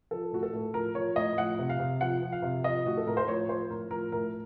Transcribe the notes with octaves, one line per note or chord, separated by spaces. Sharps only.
F3 A4
A2 F#4
A4
A2
F3 A#4
F3 C#5
A2 D#5
F3 F#5
C3
F5
C3
F3 F#5
F3
F5
C3
F3 D#5
A2 F#4
A4
A2 A#4
C5
F3 C#5
F3 C5
A2 A#4
F3 A#4
A2 A#4